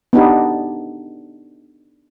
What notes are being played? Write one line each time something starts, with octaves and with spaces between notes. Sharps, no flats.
B3 D4 D#4 G4